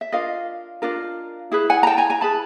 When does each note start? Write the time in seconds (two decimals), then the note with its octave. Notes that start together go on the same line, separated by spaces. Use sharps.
0.01 E5
0.12 D4 F4 A#4 D#5 F5
0.82 D4 F4 A#4
1.52 E4 G#4 B4
1.70 F#5 G#5
1.83 A#5
1.87 G5 A5
1.98 G#5 A#5
2.10 G#5 A#5
2.21 E4 G#4 B4 A5 B5